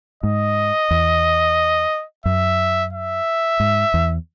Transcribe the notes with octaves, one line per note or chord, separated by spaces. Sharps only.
G#2 D#5
E2
F#2 E5
E5
G#2
E2